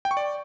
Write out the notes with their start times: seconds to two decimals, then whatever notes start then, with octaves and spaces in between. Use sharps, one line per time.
0.05 G5
0.11 C#6
0.17 D5